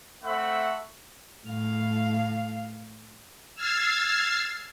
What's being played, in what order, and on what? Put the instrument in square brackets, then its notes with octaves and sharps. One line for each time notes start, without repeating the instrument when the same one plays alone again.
[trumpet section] A3 C4 E5 F#5 B5 C#6
[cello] A2 F5
[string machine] E6 F6 G#6 A6 C7